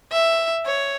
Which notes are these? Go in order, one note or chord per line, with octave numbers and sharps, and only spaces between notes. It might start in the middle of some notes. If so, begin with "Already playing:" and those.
E5
C#5